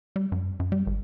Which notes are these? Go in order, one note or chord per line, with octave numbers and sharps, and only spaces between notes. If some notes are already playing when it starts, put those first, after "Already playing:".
G3
F#2
F#2
G3
G#1